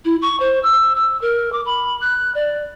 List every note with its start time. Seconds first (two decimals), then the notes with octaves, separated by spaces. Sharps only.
0.05 E4
0.21 C#6
0.40 C5
0.63 E6
0.96 E6
1.21 A#4
1.52 D6
1.65 B5
2.01 F#6
2.34 D5